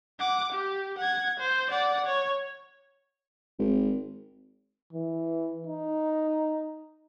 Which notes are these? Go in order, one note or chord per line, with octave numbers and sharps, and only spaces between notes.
F#5 D6
G4
F#5 G#6
C5
D5 F#5
C#5
G#1
E3
D#4